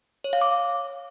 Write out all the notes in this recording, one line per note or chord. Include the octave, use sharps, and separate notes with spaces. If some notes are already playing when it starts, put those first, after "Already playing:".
C#5
F5
D6